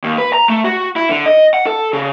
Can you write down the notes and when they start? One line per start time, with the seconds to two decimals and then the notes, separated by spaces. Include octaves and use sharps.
0.04 D#2
0.18 B4
0.33 A#5
0.49 A3
0.64 F#4
0.96 E4
1.09 D3
1.26 D#5
1.54 F#5
1.67 A4
1.93 C#3